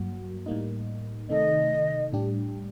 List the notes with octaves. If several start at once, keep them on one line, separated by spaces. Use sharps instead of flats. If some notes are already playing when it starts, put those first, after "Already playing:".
Already playing: G2 F#3 A#3 F#4
A2 G3 A#3 D#4
C3 D#3 A3 D#4 A4 D#5
A2 G3 D4 G4